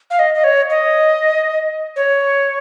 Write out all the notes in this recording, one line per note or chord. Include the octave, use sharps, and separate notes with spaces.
F5
D#5
D#5
C#5
D#5
C#5